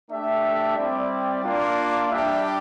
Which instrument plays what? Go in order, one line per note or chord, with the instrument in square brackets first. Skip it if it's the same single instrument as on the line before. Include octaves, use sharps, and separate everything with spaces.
[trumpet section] A3 D4 G4 E5
G3 C4 E4 D5
A#3 D4 F4
G3 D4 G4 E5